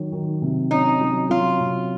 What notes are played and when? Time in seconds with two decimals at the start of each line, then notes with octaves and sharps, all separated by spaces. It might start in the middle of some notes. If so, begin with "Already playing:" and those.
Already playing: D#3 F#3
0.12 D#3
0.42 C3
0.71 C#4 D#4
1.01 F#3
1.30 F#3 F4
1.60 C3